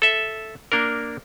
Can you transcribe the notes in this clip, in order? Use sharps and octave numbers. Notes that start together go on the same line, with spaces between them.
A4 E5
A#3 D4 A#4